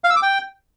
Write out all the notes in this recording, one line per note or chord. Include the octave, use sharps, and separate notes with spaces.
F5
E6
D6
G5